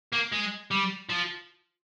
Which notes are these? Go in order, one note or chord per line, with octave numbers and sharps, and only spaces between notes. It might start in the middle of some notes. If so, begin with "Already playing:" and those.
A#3
G#3
G3
F3